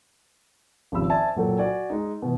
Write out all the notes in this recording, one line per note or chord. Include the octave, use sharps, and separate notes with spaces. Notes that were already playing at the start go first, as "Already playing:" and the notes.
G#1 C#3 F3 G4 B5 E6
C5 D5 E5 G#5 A5
A#2 F#3 A4 G5
F#4 D5 G#5
G#3 D#4
B2 E3